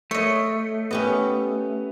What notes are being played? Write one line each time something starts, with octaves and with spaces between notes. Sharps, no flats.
A3 C#5 D#5
B3 C#4 G4 D#5